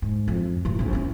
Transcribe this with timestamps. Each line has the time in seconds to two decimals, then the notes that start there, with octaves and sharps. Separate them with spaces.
0.02 G#2
0.28 F2
0.65 G2 A#2
0.79 A#1 D#2
0.93 C#4 E4